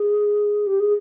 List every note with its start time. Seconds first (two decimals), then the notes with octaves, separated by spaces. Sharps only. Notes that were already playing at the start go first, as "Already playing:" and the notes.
Already playing: G#4
0.67 G4
0.80 G#4